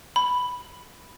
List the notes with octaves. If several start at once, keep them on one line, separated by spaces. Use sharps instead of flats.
B5